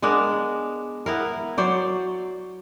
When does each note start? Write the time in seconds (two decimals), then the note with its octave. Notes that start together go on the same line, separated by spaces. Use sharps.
0.02 G#3 B3 D4 A#4
1.06 B3 E4 A#4
1.58 F#3 C5 D5